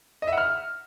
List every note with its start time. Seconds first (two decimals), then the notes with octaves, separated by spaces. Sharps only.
0.22 D#5
0.27 E5
0.32 F#5
0.38 F6